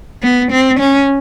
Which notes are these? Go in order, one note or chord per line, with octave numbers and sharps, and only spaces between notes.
B3
C4
C#4